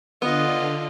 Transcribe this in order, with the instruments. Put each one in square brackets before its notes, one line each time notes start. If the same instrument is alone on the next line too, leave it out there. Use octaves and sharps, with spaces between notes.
[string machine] D3 [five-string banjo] B3 [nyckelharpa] F4 D#5